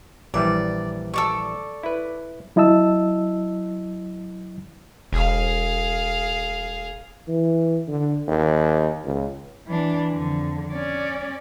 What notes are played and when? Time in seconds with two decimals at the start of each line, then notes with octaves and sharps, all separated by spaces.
0.34 A#1 E3 G3 D5
1.14 A4 D5 C#6
1.83 E4 B4
2.56 F#3 E4 D#5 A5 E6
5.13 E1 G#4 F5
7.28 E3
7.88 D3
8.28 D#2
9.05 C#2
9.67 E3 D4
10.12 F2 D3
10.73 C#4 D5